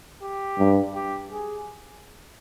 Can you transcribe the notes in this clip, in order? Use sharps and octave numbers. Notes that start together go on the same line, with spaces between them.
G4
G2
G4
G#4